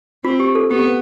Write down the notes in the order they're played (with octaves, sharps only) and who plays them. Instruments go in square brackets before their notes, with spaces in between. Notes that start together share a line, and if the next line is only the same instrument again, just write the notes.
[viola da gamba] C4 [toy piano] F4
[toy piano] G4
A4
[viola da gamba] B3 [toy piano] G4